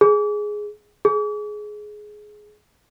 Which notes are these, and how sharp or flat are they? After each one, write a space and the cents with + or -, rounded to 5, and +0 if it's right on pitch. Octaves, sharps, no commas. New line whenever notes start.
G#4 +5
G#4 +15